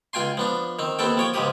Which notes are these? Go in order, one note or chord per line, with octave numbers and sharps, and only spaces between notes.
C#2 F4 G5 G#5 C6
F3 B3 D4
D#3 C4
D#2 B3 C4 A4 G5
F3 C#5 G5
C#2 G#2 C#3 F3 G4 D#6